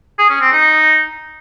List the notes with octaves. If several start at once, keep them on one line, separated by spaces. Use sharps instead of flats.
G#4
C#4
C4
D#4